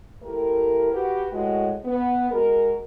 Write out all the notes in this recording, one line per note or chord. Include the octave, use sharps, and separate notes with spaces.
A3 E4 G4 A#4
F#4 G4 B4
A2 G#3 F#4
B3
G#3 F#4 G#4 A#4